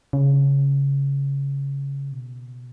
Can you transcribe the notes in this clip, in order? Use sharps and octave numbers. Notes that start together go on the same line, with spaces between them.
C#3
B2